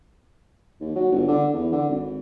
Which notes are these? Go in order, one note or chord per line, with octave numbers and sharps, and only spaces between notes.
D#2
F#3
G1
D3
E2
D3
G#1